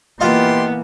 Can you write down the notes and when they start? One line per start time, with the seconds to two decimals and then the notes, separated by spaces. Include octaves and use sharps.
0.21 E3 A#3 B3 F4 G4 D#5 C6